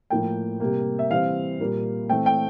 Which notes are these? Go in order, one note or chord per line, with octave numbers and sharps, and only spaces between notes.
A2 F3 A#3 G5
C3 G3 A#3
E5
E3 G3 C4 F5
A#2 G3 A#3
E3 A3 C4 G5
G5